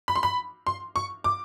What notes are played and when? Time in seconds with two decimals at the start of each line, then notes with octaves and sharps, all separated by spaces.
0.08 B5
0.16 C6
0.23 B5
0.67 C6
0.96 C#6
1.24 D6